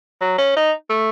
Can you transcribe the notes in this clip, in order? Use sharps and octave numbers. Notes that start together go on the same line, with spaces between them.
F#3
C#4
D#4
A3